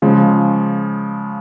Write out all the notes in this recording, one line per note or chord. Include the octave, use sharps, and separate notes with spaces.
C#3 F3 G#3